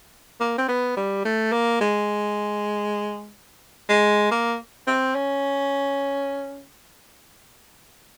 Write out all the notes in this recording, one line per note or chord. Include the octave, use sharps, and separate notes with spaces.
A#3
C4
B3
G3
A3
A#3
G#3
G#3
A#3
C4
C#4